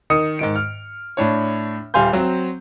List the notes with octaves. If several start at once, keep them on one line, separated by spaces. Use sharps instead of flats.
D#3 D#6 C#7
G#2 D#3 D7
F6
A2 D4 C#5
D#1 G3 F5 G#5 C6 G6
F#3 C4